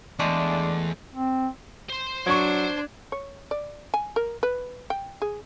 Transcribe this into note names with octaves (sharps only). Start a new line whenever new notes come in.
E2 G#3 A3 D4
C4
C5 C6
F#3 D4 C#6 G#6
C#5
D5
G#5
A#4
B4
G5
G#4